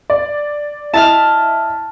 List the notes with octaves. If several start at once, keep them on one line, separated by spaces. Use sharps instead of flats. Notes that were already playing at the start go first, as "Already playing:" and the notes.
D5
E4 D#5 A5 F6